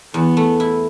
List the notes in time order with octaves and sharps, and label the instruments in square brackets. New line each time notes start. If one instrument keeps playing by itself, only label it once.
[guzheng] E2 [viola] B3
[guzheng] A3
E4